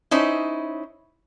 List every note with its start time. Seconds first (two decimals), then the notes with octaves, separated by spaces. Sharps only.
0.11 C#4 D#4 E4 C5